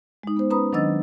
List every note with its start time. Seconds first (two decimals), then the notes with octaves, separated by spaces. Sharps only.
0.23 G#3 D#4
0.37 B3 C5
0.50 C#4 B4 A#5 B5 D#6
0.73 D#3 F#3 D4 D#5 E6 A6